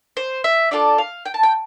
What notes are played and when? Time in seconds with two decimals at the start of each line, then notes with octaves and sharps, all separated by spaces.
0.17 C5
0.44 E5
0.71 D4 F4 A4 D5
0.98 F5
1.25 G5
1.34 A5
1.43 G5